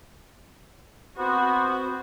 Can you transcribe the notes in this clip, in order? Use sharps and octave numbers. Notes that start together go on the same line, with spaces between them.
B3 C4 F#4 C5